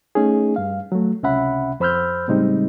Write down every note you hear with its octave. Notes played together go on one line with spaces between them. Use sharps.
A3 C#4 D#4 G#4
G2 F5
F#3 A3
C#2 C3 C#4 E5 F#5 B5
F2 C5 B5 E6 F6 G6
A2 C#3 G3 G#3 C4 D#4